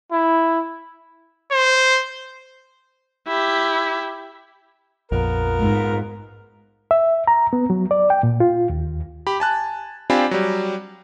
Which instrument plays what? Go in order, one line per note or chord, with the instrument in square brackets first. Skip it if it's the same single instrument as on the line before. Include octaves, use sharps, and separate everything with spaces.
[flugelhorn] E4
[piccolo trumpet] C5
[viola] E4 G4
[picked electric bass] A#1 F2 [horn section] B3 F4 A#4
[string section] G#2
[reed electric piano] E5
A#5
B3
F#3
D5
G5
A#2
F4
D#2
[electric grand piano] G4 B5
G#5 A5 F#6
C4 D4 F4 G4 G#5 B5
F#3 G3